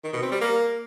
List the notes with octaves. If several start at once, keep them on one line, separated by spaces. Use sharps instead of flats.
D#3
B2
C4
G3
A#3